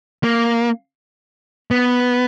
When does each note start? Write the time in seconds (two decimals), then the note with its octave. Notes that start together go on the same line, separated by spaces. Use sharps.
0.23 A#3
1.71 B3